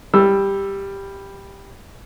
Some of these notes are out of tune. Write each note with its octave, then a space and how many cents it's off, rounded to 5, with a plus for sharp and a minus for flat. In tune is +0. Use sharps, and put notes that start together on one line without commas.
G3 +10 E6 +5